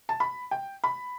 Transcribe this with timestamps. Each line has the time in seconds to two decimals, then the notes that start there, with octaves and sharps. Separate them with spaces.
0.09 A5
0.20 B5
0.51 G5
0.84 B5